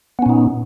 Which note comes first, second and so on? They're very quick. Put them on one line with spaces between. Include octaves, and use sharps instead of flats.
B3 C#4 A#2 D#4